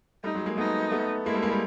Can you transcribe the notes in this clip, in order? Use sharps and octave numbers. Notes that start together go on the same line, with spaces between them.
G3 A3 D#4
F#3 G#3
G#3 A#3
A3 B3 D#4
A3 B3
G#3 A#3 E4
G3 A3
G#3 A#3
G3 A3